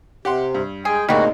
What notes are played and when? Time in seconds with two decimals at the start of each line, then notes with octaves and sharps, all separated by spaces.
0.25 C3 G4 F#5 C6
0.54 G2
0.85 G#3 G#4 G5
1.09 D2 A2 C3 G3 G#3 A#3 D#4 F#4